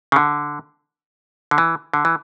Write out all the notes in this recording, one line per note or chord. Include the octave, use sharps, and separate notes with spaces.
C#3
D3
D3
E3
D3
E3